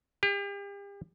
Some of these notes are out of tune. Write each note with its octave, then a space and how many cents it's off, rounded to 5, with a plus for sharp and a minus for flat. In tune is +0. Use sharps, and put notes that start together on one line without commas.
G4 +40